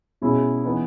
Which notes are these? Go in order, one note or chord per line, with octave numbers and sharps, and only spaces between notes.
B2 G#3 C#4 E4 G#4
E3 B3 D#4